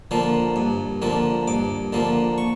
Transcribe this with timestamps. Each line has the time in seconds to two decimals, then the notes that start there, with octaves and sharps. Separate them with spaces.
0.11 D3 F3 A#3
0.56 G2
1.02 D3 F3 A#3
1.48 G2 D6
1.93 D3 F3 A#3
2.38 C#6